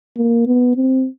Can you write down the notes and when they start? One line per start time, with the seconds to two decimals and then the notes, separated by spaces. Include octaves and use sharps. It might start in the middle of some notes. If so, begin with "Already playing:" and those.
0.17 A#3
0.47 B3
0.76 C4